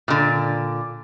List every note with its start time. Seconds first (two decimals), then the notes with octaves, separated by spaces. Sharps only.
0.08 A#2 D3